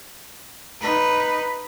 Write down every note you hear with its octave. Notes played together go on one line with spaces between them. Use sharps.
D#4 B4